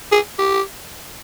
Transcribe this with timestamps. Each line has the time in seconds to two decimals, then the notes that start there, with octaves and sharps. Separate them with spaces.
0.12 G#4
0.38 G4